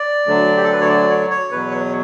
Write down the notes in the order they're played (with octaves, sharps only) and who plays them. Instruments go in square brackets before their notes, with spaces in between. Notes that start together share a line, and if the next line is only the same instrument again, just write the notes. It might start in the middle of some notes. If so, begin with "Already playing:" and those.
Already playing: [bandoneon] D5
D2 D3 F#3
G4
A4
B4
C#5
D5
C#5
C#5
E2 B2 F#3 B4
C#5